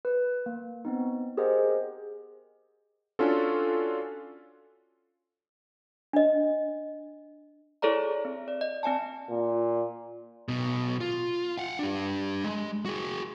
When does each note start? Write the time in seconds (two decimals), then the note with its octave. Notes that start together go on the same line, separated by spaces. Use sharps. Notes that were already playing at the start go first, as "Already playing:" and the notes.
0.05 B4
0.46 A#3
0.85 B3 C4 D#4
1.37 G4 G#4 A#4 C5 D#5 F#5
3.19 C#4 D4 F4 F#4 A4
6.13 D4 D#5
7.82 E4 G#4 A4 C#5 D5 A#5
8.25 C4
8.48 D5
8.61 D#5
8.83 C4 D5 G#5 A5
9.30 A#2
10.48 B1 B2
11.01 F4
11.58 F5 F#5
11.79 D4 G4
12.44 G#3
12.86 F#4 G#4